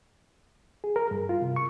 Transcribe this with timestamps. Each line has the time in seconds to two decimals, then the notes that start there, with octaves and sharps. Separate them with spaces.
0.84 G#4
0.96 A#4
1.11 G2
1.29 F4
1.41 C3
1.56 C#6